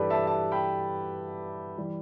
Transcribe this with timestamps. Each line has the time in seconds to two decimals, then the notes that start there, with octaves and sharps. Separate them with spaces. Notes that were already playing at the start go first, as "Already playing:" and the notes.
Already playing: G2 E3 G3 G4 A4 B4 D5
0.10 E5 A5
0.27 E5 A5
0.52 G5 B5
1.78 E3 G3